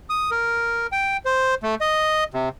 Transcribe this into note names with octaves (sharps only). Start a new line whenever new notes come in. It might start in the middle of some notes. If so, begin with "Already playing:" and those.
D#6
A#4
G5
C5
A3
D#5
C3